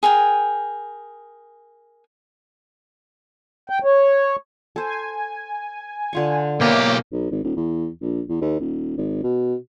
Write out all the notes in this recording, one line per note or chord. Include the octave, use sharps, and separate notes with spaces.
G#4 A#4 G5 G#5
G5
C#5
A4 C5 G#5
D3 F4 C#6
B1 A#3 G4 C#5 D#5 E5
B1
G#1
D#1
E2
A#1
E2
D#2
D#1
G#1
B2